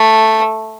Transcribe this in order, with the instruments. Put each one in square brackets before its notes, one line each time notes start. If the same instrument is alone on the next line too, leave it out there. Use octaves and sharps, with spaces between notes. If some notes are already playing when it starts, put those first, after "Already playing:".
Already playing: [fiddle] A3